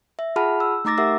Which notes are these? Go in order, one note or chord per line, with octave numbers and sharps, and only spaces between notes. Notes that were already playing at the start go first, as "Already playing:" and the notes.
E5
F4 G#4 F#5 A5 B5 F6
E6
A3 D#4 A#5 D6 A6 A#6
G4 A#4 E5 F#5 D6 E6